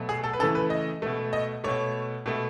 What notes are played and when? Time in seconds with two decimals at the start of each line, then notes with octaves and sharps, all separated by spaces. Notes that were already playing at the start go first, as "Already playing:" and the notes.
Already playing: B2 F#3 A3
0.09 G#4
0.24 A4
0.33 B4
0.39 C#3 E3 A3 A4
0.55 B4
0.70 D#5
1.02 B2 A3
1.33 D#5
1.64 B2 A3 C#5
2.26 B2 A3